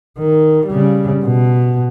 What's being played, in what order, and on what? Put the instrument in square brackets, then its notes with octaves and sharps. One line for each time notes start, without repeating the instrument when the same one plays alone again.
[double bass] D#3
C#3 G3
B2